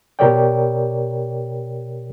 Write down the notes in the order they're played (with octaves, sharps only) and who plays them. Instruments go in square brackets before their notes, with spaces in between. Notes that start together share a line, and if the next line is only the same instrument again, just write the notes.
[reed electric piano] B2 G4 A#4 C#5 D5 G5